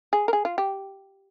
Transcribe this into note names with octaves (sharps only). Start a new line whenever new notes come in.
G#4
A#4
G#4
F4
G4